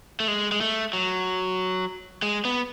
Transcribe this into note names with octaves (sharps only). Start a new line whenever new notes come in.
A3
G#3
G#3
A3
F#3
G#3
B3